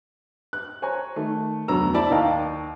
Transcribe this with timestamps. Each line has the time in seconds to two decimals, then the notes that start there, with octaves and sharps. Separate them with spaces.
0.53 F#6
0.82 C5 C#5 G#5 A#5
1.16 D#3 A3
1.68 F1 D2 F#3 B3 A#5 E6
1.94 E4 C5 D5 E5 A5 B5
2.11 D#2 D#5 F5 G5 A#5